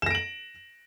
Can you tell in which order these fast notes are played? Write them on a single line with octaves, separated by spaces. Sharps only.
E7 A#6 D7 F#7